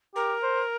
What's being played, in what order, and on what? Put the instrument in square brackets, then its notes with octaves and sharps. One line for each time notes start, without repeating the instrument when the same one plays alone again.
[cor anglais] G4 [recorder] A#4
[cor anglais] C5